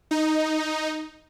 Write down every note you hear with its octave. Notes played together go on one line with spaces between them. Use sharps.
D#4